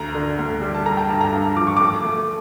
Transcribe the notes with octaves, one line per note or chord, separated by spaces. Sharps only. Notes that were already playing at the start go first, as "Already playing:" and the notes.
Already playing: D2 A#5
D3
D2
G3
A5
A3 A#5
G5
G2 A5
A#5
G2
F3 D6
C#6
A3 D6
A3